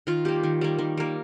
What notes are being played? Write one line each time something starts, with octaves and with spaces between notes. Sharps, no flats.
D#3 F4
G3 A#3 G4
D#3
G3 A#3
D#3
G3 A#3